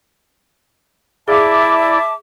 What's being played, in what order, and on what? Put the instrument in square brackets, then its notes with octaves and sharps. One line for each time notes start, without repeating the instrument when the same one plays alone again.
[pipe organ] E4 D5 [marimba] G#4 F5 [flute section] E5 A5 D6